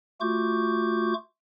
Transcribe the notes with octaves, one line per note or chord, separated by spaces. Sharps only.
A3 F4 F#4 C#6 D6 G6